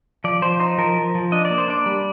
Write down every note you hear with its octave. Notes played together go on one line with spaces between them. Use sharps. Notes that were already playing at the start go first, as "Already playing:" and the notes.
F3 D5
F3 C5
D#4 C5
F3 A#4
F3
F3
D4 D#5
D5
A#3
C5
D4 D5
G3